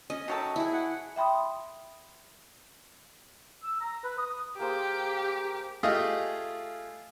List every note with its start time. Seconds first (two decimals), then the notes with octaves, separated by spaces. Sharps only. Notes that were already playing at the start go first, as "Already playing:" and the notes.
0.10 C#4 D#5
0.28 D#3 F#3 F#4 A4
0.56 E4 G#4
0.73 F#5
1.16 E5 G5 B5 C6 D#6
3.63 E6
3.81 A#5
4.04 B4
4.18 D#6
4.59 A#3 G4 G#4 C5
5.83 A3 F4 G4 G#4 D#5 F5